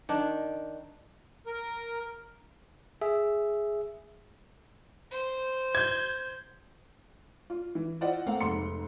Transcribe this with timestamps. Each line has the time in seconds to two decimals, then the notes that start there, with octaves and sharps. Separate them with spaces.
0.09 D#3 D4
1.46 A#4
3.02 G#4 E5
5.11 C5
5.75 G6 G#6
7.50 F4
7.75 E3
8.01 E4 F4 C5 D5 D#5 F#5
8.26 A3 A#3 C4 F5 F#5
8.41 F1 G#2 C6 C#7